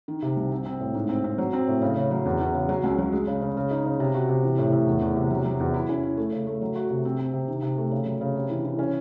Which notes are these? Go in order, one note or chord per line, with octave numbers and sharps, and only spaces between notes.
D#3
C3
C2
C4
C4
A2
G#2
C4
C4
F#3
C4
A2
C#3
C#3
F#3
E2
E2
C#3
F#3
C#2
F#3
G#3
C#3
C#3
C#3
D#4
C#3
C3
F#4
C3
E3
A2
A2
E2
E2
C3
F#3
F#3
E2
E4
C#4
E4
A3
C#3
A3
F#3
F#4
C3
C4
C4
C3
D#3
C3
A3
C#3
F#3
C#3
C3
E3
E3
C#4